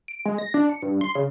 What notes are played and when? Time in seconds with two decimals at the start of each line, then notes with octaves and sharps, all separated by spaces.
0.08 D7
0.25 G#3
0.38 A#6
0.54 D4
0.70 C#7
0.82 G2
1.01 C6
1.15 C#3